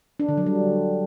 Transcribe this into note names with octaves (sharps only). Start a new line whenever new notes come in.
D4
D3
F#3
G3